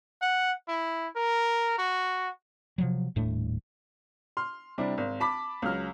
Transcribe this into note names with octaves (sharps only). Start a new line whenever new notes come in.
F#5
E4
A#4
F#4
C3 F3 F#3
D#1 A2 A3 D4
C6 F6
C3 G3 D4 E4
G#1
A5 B5 D6 B6
C#2 F#3 F6